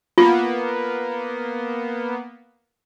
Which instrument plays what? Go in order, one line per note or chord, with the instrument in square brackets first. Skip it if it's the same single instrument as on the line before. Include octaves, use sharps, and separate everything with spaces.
[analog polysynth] A#3 B3 [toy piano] F4